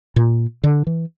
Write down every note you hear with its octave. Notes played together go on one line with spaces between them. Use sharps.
A#2
D3
E3